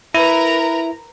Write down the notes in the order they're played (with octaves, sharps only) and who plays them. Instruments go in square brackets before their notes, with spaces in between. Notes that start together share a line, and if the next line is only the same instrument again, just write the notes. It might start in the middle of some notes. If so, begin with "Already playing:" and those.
[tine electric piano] E4 [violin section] A#4 B4 A#5